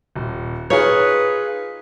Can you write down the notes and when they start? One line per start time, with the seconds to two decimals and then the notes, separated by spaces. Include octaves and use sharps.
0.15 D#1
0.70 D#4 F4 G#4 B4 C#5